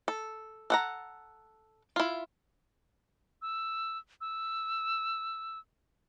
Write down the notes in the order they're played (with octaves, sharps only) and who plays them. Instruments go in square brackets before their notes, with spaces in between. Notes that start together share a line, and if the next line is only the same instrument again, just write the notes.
[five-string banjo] A4
A4 F#5 A#5
E4 F4
[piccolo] E6
E6